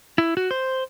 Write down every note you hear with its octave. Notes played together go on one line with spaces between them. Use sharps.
E4
F#4
C5